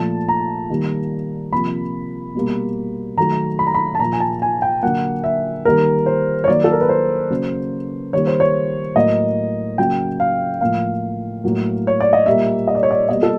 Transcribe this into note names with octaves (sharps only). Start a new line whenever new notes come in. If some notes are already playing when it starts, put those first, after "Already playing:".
Already playing: A#2 F3 A3 A5
A#5
D#3 G3 A#3
C3 F3 A#3 B5
B2 G3 A#3
D#3 F#3 A3 A#5
B5
A#5
B5
A5
A#2 F3 A#3 A#5
G#5
A5
G#5
G5
D3 F#3 A#3 F#5
E5
D#3 G3 A#3 A#4
C5
C#5
D#3 F#3 A#3 D5
A4
A#4
B4
C5
C#3 F#3 A#3
D#3 G3 A#3 C#5
C5
C#5
A2 F#3 A#3 D#5
C#3 F#3 A#3 G5
F5
A2 F3 A#3 F5
A2 F#3 A#3
C#5
D5
D#5
A#2 G3 A#3 E5
D#5
D5
C#5
D5
B2 G3 A#3 D#5
A4